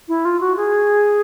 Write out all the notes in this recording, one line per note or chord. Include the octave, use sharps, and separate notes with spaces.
E4
F4
F#4
G#4